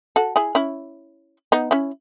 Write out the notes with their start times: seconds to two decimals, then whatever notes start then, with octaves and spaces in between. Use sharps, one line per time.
0.16 F#4 A4
0.36 E4 G#4
0.55 C#4 E4
1.52 B3 D#4
1.71 C#4 E4